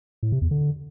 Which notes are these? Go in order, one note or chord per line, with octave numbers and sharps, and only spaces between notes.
A2
C3
E2
D3